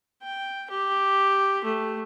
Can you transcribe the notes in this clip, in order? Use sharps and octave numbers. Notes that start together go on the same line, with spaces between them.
G5
G4
A3